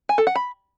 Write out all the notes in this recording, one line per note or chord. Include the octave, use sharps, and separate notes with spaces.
G#5
A4
F#5
B5